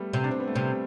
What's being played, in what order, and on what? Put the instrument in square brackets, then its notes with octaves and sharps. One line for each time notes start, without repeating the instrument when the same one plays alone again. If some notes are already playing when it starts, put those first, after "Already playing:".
Already playing: [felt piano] G3 A3 B3
[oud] C3 [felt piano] G3
[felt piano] D4
C4
B3
A3
[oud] C3 [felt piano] G3